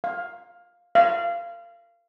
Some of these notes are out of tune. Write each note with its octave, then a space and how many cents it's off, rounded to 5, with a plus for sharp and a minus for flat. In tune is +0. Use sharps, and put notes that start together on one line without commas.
F5 +10
F5 -25